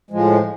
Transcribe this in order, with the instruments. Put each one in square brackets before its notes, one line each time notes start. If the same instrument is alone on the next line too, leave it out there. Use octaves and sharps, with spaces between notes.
[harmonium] A2 F3 G#3